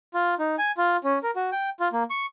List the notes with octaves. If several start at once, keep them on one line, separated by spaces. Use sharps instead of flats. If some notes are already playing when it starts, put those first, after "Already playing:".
F4
D#4
G#5
F4
C#4
A#4
F#4
G5
F4
A#3
C#6